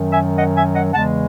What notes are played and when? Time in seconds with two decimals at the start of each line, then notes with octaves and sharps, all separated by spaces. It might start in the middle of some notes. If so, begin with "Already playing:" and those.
Already playing: F#2 D#3 F#3
0.11 E5 G#5
0.38 D#5 F#5
0.57 E5 G#5
0.74 D#5 F#5
0.92 E2 C#3 E3 G#3 F#5 A5